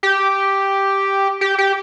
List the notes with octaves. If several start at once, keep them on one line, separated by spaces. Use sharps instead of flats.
G4
G4
G4